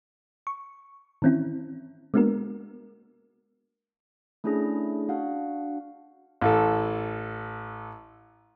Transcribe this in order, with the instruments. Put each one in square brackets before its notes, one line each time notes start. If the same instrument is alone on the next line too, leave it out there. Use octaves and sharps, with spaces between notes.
[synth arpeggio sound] C#6
D#3 E3 C4 C#4 E4
G#3 A#3 B3 D4 F#4 A#4
[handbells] A3 C#4 D4 E4 G#4 A#6
D4 F#4 F5 F#5
[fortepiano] A1 A4